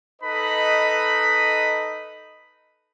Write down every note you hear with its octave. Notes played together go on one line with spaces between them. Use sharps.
D#4 A4 B4 D#5 B5